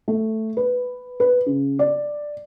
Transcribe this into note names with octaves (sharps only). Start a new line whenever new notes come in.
A3
B4
B4
C#3
D5